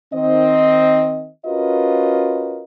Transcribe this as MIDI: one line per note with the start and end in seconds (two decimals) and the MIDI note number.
0.13 1.29 51
0.13 1.29 60
0.13 1.29 75
1.46 2.64 61
1.46 2.64 65
1.46 2.64 66
1.46 2.64 70
1.46 2.64 71
1.46 2.64 75